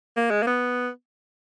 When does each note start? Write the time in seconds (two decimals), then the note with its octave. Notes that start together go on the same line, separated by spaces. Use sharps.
0.17 A#3
0.31 G#3
0.43 A#3
0.47 B3